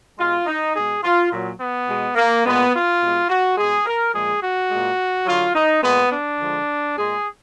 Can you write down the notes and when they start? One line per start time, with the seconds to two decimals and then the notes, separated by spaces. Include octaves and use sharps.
0.19 B2 G#3 F4
0.47 D#4
0.75 B2 G#3 G#4
1.04 F4
1.32 A#2 F#3
1.60 B3
1.88 B2 G#3
2.16 A#3
2.44 A#2 G#3 B3
2.73 F4
3.01 B2 G#3
3.30 F#4
3.57 B2 G#3 G#4
3.86 A#4
4.13 A#2 F3 G#3 G#4
4.42 F#4
4.71 A#2 G#3
5.27 D3 F#3 F4
5.55 D#4
5.83 A#2 G#3 B3
6.11 D4
6.39 D3 F3 G#3
6.96 A#2 G#3 G#4